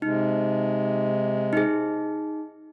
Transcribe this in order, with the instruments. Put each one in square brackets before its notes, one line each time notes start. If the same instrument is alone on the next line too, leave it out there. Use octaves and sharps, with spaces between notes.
[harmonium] C3 G#3 [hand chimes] D#4
[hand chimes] D#4 G#4